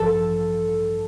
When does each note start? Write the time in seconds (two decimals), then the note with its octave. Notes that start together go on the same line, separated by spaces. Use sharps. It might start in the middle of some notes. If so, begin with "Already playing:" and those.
Already playing: A1 G2 F3 A4